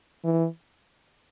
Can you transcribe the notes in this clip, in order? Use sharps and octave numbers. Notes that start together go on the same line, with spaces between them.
E3